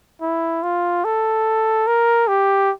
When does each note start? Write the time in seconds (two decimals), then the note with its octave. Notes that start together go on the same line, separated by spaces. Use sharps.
0.22 E4
0.63 F4
1.05 A4
1.87 A#4
2.28 G4